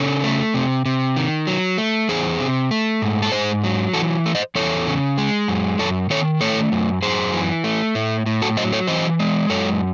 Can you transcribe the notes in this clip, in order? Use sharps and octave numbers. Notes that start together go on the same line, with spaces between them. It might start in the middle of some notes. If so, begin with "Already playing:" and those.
Already playing: C#3 A4 C#5
A3
C3
C3
D#3
F#3
A3
E2 G#4 C5
C3
A3
G#2
A4
G#2 G#4 C5
F#3
E3 F#4 A4
A3
C5 D#5
E2 A4 C#5
C#3
G#3
F#2
F#2 A4 C#5
D#3 A4 C#5
A3 A4 C#5
F#2
F#2 G#4 C5
E3
A3
A2
A2
F#4 A4
F#3 C5 D#5
A4 C#5
E3 C5 D#5
G#3
F#2 A4 C#5